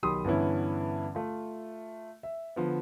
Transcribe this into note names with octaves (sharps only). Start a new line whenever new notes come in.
B1 D#3 G4 B5 C6 D#6
G2 D3 E3 B3 C#4 E4
A3 F4
E5
D3 F3 B3